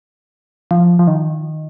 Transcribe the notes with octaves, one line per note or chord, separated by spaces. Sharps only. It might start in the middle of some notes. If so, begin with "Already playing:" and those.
F3
F3
D#3